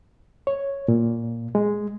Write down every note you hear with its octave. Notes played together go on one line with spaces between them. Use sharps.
C#5
A#2
G#3